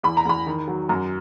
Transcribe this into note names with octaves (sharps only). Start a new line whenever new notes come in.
E2 B5
A#5
E2 B5
D#3
F#3
F#2 A#5